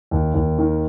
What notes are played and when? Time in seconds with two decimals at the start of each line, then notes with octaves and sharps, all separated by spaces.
0.11 D#2
0.34 D#2
0.58 D#3